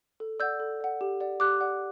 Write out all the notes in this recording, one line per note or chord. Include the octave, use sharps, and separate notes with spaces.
A4
D5 F#5 E6 G6
A4
D5 F#5
G4
D5 F#5
G4 D6 F#6
D5 F#5